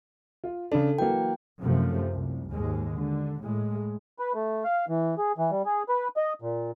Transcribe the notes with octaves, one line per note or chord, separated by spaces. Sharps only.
F4
C#3 D4 A4
E3 F#3 A#3 G5
F#2 C3 F3 A3
C2
D#2 G#2 G#3
D3
A2 G#3
B4
A3
F5
E3
G#4
E3
G3
G#4
B4
D#5
A#2